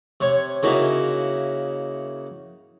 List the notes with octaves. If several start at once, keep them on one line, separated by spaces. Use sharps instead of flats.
C3 C#5
C#3 A#3 C#4 D#4 E4 F#4